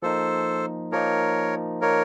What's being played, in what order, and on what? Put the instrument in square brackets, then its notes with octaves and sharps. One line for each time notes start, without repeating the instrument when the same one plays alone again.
[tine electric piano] F3 A#3 D#4 [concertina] A4 C5
[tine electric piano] F3 A#3 D#4 [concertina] A#4 C#5
[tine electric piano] F3 A#3 D#4 [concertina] A#4 C#5